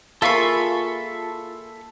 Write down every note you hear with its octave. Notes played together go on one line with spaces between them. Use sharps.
A#3 F4 G#4 A4 E5 B5 C#6